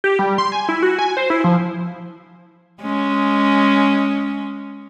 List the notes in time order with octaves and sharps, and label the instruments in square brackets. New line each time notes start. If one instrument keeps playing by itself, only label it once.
[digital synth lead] G4
G3
C6
G#5
E4
F#4
G#5
C5
E4
F3
[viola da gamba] G#3 C#4